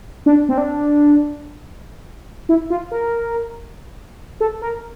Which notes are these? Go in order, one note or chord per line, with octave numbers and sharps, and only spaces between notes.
D4
C4
D4
E4
F4
A#4
A4
A#4